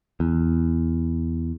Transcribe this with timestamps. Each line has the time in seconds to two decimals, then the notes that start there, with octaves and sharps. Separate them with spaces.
0.20 E2